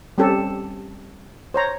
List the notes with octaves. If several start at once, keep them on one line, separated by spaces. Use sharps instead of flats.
G3 C4 C#4 G4 A4
C5 C#5 A#5